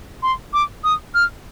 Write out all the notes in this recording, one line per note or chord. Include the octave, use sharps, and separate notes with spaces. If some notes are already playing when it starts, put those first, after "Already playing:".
C6
D6
D#6
F6